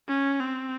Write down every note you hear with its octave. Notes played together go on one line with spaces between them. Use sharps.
C#4
C4